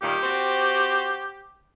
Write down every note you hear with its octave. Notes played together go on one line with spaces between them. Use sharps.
G2 A#2 D#3 G4
C4 F#4 C5